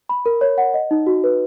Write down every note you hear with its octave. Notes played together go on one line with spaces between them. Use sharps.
B5
A#4
C#5
F#5
D#5
D#4
F#4
B4